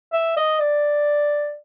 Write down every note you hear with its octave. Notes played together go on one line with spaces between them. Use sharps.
E5
D#5
D5